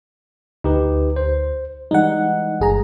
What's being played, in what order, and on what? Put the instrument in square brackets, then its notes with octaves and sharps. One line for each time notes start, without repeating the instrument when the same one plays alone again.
[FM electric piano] D2 [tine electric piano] D#4 G4 B4
[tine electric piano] C5
[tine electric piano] E3 G3 G#3 [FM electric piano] D#4 F#5
[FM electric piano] G1 G#4 A#5